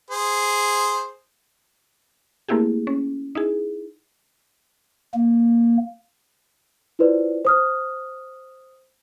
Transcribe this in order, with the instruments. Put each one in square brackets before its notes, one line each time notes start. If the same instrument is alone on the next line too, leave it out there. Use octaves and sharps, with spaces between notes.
[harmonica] G#4 C5
[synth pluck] A3 A#3 C4 E4 G4 G#4
C#4
D#4 E4 G#4
[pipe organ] A#3
[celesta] E4 F4 B4 C5 D5
C5 D#6 F6